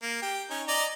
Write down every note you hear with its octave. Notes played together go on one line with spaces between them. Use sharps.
A#3
G4
C#4 D#4
D5 D#5 A#5